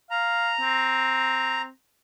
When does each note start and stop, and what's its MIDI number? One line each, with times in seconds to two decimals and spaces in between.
0.11 0.53 77
0.11 1.62 82
0.61 1.70 60